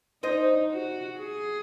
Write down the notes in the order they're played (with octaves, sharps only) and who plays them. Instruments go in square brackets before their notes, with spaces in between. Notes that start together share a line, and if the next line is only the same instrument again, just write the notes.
[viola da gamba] D#4 [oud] C5 D#5
[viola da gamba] F#4
G#4